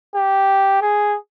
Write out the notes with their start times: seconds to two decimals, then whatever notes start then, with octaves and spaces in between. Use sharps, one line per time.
0.15 G4
0.82 G#4